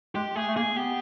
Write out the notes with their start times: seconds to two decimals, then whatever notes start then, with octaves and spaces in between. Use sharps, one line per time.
0.15 G#3 G4
0.36 A3 G#4
0.47 A3
0.56 A#3 G#4
0.76 B3 G4